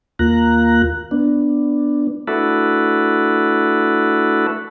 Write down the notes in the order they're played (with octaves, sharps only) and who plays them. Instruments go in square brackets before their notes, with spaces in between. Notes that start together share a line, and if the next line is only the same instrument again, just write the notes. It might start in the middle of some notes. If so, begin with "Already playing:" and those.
[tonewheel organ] D#2 A#3 F4 A#5 F#6
B3 D4
A3 D4 E4 F#4 A4 B4